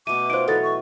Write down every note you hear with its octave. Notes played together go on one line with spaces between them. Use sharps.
B2 A3 D6 D#7
D#4 F4 C5 D7
E3 F#3 A4 B4 C#5 A6
C#6